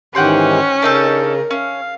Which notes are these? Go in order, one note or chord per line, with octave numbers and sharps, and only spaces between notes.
G#2 D#3 E3 C#4 G4 F#5 G5 C6
C#3 D4 D#4 A4 A#4
C#4 F5